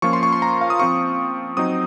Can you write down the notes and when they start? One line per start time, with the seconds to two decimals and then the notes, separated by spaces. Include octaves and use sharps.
0.02 F3 A#3 C#4 F4 C#6
0.13 C6
0.23 C#6
0.32 C6
0.42 A#5
0.61 F5
0.70 D#6
0.80 F3 C4 F4 C#6
1.57 F#3 C4 D#4 D#6